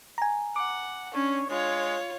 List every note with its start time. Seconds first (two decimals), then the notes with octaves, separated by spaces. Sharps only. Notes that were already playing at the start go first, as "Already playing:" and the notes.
0.18 G#5 A#5
0.56 F#5 D6
1.14 C#4 D4 C#5
1.50 G#3 F4 C#5